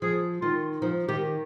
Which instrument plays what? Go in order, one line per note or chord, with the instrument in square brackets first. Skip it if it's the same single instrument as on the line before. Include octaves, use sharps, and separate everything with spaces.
[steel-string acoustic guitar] F3 [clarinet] G#4
[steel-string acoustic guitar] D#3 [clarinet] F4
[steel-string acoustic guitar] F3 [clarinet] D#4
[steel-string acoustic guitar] D#3 [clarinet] G4